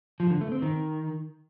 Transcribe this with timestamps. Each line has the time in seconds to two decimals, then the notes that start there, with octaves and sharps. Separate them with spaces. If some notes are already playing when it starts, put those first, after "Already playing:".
0.20 F3
0.30 D3
0.41 A3
0.52 C4
0.62 D#3